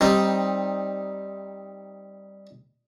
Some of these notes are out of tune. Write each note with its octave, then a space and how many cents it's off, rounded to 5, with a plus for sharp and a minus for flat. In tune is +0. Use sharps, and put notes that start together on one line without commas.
G3 +0 C4 +20 D#4 +5